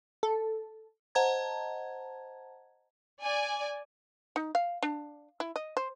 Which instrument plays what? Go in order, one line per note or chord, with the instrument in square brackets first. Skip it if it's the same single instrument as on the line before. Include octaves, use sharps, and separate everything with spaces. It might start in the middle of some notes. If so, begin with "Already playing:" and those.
[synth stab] A4
[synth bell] C5 D#5 F#5 A5 A#5 G#6
[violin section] D5 G#5
[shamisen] D#4
F5
D4
E4
D#5
C5